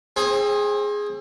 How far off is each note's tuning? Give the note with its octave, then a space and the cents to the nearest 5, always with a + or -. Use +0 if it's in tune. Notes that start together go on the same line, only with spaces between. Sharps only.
C4 +30 G#4 +0